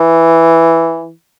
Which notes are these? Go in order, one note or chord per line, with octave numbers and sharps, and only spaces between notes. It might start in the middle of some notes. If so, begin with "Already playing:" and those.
Already playing: E3